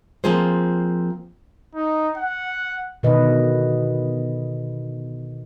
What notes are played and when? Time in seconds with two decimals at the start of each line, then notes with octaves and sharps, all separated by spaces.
0.24 F3 A#3 C4 F4 G#4 C5
1.75 D#4
2.17 F#5
3.03 B2 D3 D#3 B4 D#5